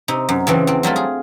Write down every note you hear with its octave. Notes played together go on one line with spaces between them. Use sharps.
C3 D#4
F#2
C#3 E3 C4 D4
E2 C4
F#3 G3 A3 F4
G#4